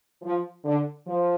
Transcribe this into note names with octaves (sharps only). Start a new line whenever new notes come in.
F3
D3
F3